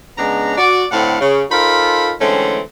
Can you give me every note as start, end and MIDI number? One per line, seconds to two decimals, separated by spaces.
0.18 0.57 49
0.18 0.57 56
0.18 0.57 59
0.18 0.57 62
0.18 0.57 82
0.58 0.85 66
0.58 0.85 74
0.92 1.18 45
0.92 1.18 50
0.92 1.18 60
0.92 1.18 64
0.92 1.18 77
0.92 1.18 78
1.21 1.43 49
1.51 2.13 63
1.51 2.13 65
1.51 2.13 69
1.51 2.13 70
1.51 2.13 72
1.51 2.13 83
2.20 2.60 50
2.20 2.60 52
2.20 2.60 56
2.20 2.60 57
2.20 2.60 60
2.20 2.60 61